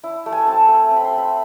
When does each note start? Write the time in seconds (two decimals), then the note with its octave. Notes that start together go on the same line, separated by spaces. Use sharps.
0.03 E4
0.26 A3
0.32 G#5
0.47 C4 A5
0.68 A3
0.91 C4
0.96 B5
1.04 C6
1.11 A3
1.18 B5